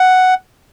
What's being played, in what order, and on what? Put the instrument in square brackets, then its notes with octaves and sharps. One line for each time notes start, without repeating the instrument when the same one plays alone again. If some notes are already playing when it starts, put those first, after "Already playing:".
Already playing: [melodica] F#5